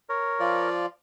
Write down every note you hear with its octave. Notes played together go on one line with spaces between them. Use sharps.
A#4 C#5
F3 F4 D5